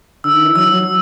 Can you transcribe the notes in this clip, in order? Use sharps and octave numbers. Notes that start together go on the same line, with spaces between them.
D3 E6
D#3
E3
F#3 E6
F#3